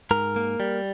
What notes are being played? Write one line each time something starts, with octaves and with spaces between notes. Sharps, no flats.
G#2 A#4
A#3
G3